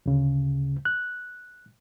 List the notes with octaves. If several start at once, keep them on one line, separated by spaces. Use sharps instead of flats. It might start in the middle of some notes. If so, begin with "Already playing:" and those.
D2 C#3
F#6